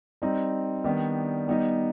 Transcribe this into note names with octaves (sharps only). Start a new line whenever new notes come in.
G3 C4 D#4
D#3 G3 B3 D4
G3 B3 D#4